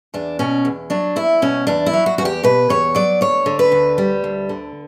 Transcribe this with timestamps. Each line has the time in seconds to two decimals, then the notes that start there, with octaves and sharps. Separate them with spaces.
0.14 E2 D4
0.39 B2 C#4
0.65 E2
0.90 F#3 D4
1.16 E2 E4
1.42 B2 C#4
1.67 E2 D4
1.86 E4
1.93 F#3
2.06 F#4
2.18 E2 F#4
2.25 G4
2.43 B2 B4
2.69 E2 C#5
2.95 F#3 D5
3.21 D2 C#5
3.46 D3
3.59 B4
3.72 D2
3.98 G3
4.24 D2
4.49 D3